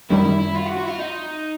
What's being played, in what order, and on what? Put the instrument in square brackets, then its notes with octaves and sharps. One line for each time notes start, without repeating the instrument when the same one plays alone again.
[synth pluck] F#2 D#3 G3 [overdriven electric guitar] E4
[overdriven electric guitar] E4
E4
F4
F#4
F#4
E4
F4
D#4